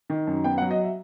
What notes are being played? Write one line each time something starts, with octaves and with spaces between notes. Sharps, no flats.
D#3
F#2
B3 G5
F#5
F#3
D#5
E5